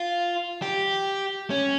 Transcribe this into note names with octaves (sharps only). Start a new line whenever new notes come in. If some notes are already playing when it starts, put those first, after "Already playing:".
Already playing: F4
G4
C#4